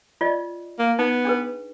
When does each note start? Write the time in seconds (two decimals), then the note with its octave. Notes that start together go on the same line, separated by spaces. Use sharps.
0.21 F4 D5 D#5
0.79 A#3
0.99 B3 D#4
1.25 D4 G#4 B4